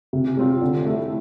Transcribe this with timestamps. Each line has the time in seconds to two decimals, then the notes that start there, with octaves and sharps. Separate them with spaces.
0.13 C3
0.37 G3 C4 F4
0.62 D3
0.85 A3 E4 G4